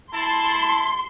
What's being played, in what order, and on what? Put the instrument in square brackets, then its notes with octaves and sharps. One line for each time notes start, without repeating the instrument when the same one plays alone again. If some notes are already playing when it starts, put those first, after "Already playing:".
[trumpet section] E4 A5 [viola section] C6